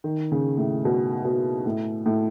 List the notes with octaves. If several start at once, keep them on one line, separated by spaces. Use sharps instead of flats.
D#3
C#3
A2
B2
B2
A2
A2